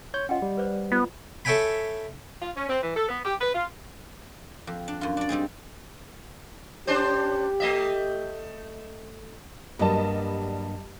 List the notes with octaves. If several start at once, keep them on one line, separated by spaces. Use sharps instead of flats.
C#5 C6 G6
C#4 F4 D#5 F#5 G5
G3
B4 C5 D5
B3 F4
A4 C#5 E5 G5 G#5 B5
F4
C#4
C4
E3
A4
B3
G4
B4
F4
F2
D4
F#2 F4
D4 D5
G3 C4 D#4 G#4
C#4 D4 G4 C5
A3 D#5 E5
G2 F#3 G3 A#3 D#5 A5